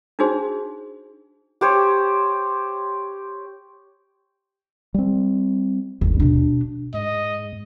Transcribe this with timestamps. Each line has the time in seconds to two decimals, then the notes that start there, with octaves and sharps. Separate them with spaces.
0.19 D4 D#4 F#4 G#4 C5
1.61 G4 C5 C#5
4.94 G3 C4
6.01 G1 D#2
6.20 B2 D4
6.94 G#2 D#5